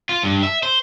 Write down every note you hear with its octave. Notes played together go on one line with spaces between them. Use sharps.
F4
G2
E5
C5